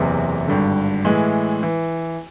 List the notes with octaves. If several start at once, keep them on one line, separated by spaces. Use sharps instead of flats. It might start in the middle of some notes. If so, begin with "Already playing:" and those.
Already playing: F#1 E2 C3 E3
G#1 G2 D3
A2 E3 G#3
E3